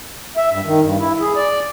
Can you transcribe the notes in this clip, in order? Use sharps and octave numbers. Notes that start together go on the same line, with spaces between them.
E5
G2
D#3
G2
E4
G#4
D5